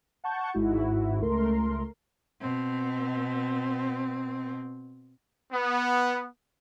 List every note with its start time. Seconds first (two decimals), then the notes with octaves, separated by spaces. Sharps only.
0.24 F#5 A5 C#6 G6
0.54 G#1 G#2 E4 F#4
1.21 C#2 A3 A#4 C6
2.40 B2 C4
5.52 B3